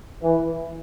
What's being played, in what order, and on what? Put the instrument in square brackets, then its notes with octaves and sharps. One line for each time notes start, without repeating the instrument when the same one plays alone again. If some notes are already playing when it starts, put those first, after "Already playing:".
[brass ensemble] E3